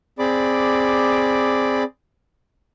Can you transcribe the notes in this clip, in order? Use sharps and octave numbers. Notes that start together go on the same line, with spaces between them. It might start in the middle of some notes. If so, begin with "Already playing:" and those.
C4 G#4 D5 B5 D6